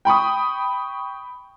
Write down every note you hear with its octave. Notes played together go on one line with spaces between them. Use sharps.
G5 B5 C#6 D#6